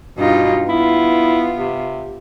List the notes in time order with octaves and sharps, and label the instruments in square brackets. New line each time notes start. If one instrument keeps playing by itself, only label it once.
[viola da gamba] G2 D#4 F4 [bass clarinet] B2
[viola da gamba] B3 F4 [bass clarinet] E4
[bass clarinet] C3